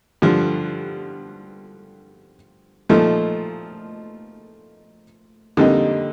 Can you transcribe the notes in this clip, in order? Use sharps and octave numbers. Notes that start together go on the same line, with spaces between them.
G2 D3 F3
A#2 F3 A3 D#4 A4
F2 D3 G3 A#3 D#4